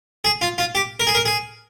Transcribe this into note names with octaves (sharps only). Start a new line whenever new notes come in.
G#4
F4
F4
G4
A#4
G#4
A#4
G#4